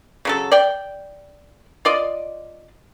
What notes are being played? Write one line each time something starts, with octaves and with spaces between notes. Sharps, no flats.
C#3 F#3 A4
D5 G5
F4 D5 D#5